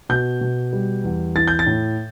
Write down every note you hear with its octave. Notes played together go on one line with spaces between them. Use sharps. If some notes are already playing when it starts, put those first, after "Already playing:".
B2 G6
B2
G3
E2
E3 A6
G6
A6
A2